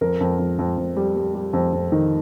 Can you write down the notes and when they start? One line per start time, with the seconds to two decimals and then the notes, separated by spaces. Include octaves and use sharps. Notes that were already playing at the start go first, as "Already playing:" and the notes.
0.01 F2 A#4
0.21 F2
0.39 F2
0.59 F2
0.77 F2
0.97 G3
1.16 G3
1.35 G3
1.53 F2
1.73 F2
1.92 D#3